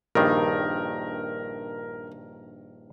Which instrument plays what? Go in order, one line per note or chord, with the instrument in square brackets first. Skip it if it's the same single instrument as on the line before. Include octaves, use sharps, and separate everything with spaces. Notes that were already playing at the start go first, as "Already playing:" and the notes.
[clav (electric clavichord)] A#1 G2 D#3 [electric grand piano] A#4